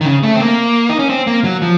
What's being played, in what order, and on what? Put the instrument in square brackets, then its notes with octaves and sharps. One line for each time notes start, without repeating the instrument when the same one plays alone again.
[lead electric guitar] D#3
C#3
A3
C4
A#3
D#4
C#4
C4
A#3
F#3
F3